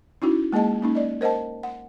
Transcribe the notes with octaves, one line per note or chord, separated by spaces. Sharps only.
C#4 D#4 E4 F#4
G#3 A#3 G#4 D#5 A5
A#3 C#4 D#4
D5 D#5
A#4 C5 D#5 F#5 A5
F#5